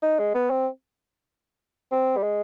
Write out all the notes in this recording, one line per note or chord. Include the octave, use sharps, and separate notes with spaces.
D#4
G#3
B3
C4
C4
G3
G#3